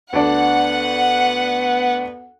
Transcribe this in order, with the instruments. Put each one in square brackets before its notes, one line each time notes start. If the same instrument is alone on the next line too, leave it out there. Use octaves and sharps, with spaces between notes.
[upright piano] D2 D4 [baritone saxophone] B3 [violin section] F#5